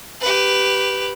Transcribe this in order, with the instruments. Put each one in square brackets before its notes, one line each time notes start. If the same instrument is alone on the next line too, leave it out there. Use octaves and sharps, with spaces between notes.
[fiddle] G4 B4